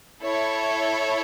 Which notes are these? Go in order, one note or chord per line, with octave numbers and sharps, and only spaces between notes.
E4 A4 C#5